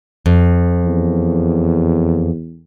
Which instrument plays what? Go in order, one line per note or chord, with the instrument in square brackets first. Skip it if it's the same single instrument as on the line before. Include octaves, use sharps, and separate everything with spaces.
[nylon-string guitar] F2
[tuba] E2